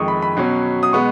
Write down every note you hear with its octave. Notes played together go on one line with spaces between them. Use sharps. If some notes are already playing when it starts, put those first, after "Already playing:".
Already playing: F2 D#3 G#3 C#6 D#6
B5
B5
B2 F#3 C#4
D#6
B2 G#3 B3 C#6